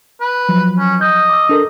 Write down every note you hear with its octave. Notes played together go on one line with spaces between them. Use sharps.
B4
F3 F#3
C#4
D#5 G6
D6 E6
D4 A4 A#4